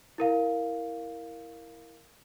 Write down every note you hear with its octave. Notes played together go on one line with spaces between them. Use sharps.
E4 A#4 F5